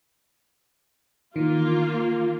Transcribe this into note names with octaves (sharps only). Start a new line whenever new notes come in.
D#3 E3 A#3 F4